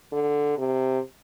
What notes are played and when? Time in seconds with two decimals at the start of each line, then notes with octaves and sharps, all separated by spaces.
0.13 D3
0.58 C3